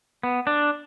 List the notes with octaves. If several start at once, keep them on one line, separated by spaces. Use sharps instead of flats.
B3
D4